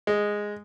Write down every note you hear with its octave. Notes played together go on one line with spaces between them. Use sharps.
G#3